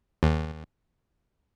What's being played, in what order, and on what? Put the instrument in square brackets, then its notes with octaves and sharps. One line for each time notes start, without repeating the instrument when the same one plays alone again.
[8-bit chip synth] D#2